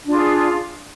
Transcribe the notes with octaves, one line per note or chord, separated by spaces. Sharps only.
D4 F4 G#4